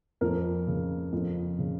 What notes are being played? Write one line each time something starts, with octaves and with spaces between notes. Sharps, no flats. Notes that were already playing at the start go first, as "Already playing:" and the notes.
F2 A#4
C#3
F2
C#3